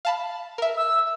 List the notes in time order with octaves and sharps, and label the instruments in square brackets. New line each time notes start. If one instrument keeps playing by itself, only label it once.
[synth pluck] F5 A5 B5
A#4 E5
[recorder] E6